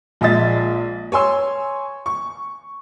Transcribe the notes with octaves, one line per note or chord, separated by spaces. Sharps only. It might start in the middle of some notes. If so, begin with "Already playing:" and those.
A#1 G#3 D#5 E5 A6
C#5 G#5 C6 E6
C#6